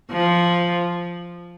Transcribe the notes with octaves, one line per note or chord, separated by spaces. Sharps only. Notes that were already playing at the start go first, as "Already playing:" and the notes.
F3